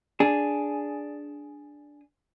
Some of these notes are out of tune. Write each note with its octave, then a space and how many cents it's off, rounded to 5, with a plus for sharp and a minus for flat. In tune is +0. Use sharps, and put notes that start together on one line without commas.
D4 -5 G#4 +0